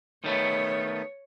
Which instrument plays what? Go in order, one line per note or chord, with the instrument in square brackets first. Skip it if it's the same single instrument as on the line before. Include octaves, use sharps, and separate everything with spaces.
[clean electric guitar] D#3 A3 B3 [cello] C#5